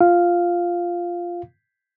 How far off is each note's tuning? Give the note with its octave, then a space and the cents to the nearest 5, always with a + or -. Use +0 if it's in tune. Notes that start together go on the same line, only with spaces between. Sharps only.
F4 +0 F5 +0